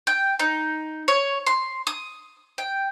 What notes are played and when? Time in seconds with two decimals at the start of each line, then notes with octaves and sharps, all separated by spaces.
0.07 G5
0.39 D#4
1.08 C#5
1.47 C6
1.87 D#6
2.58 G5